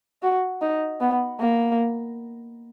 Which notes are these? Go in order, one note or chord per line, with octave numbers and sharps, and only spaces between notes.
F#4
D#4
B3
A#3